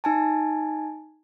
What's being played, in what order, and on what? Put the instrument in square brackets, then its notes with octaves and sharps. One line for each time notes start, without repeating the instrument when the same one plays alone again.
[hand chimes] D#4 G#5 A5